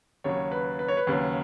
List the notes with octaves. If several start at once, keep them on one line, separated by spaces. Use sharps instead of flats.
D#2 C#3 F#3 C#5
B4
B4
C#5
B4
D#2 C#3 F#3